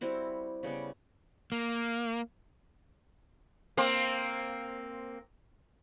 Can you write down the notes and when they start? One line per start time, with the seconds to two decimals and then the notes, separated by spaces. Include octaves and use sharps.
0.01 G3 C4 E4 F#4
0.63 C#3 G3 B3
1.52 A#3
3.77 A#3 C4